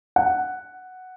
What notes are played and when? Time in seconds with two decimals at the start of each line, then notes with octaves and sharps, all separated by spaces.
0.16 F#5